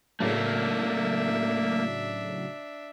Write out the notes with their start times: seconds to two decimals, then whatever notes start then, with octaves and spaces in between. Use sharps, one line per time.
0.20 A2 C#3 F#3 A3 A#3 D4 E5